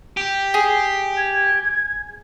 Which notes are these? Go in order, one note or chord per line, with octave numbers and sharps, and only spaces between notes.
G4
G#4
G#6